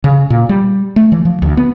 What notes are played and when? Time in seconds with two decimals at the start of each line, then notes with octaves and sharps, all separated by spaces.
0.04 C#3
0.30 A#2
0.49 G3
0.96 A3
1.12 E3
1.25 F3
1.42 D2
1.57 B3